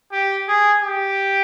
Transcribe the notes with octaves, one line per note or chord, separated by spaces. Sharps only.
G4
G#4
G4